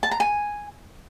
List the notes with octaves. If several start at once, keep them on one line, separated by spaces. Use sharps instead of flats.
A5
A#5
G#5